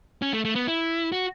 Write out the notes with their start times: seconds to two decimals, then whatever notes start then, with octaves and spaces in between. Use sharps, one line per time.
0.22 C#4
0.33 A3
0.45 A3
0.55 B3
0.67 E4
1.12 F#4